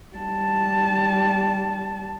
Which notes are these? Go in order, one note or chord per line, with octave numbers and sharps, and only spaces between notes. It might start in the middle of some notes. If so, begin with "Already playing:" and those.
G3 A5